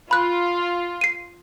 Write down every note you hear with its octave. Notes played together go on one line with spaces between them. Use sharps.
F4 B5 F#6
C7 D#7